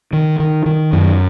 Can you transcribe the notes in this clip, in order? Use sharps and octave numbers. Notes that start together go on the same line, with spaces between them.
D#3
D#3
D#3
F#2